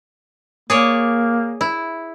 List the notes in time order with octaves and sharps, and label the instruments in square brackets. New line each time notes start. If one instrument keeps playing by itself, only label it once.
[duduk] A#3 [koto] G#4 C#5 D5
[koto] E4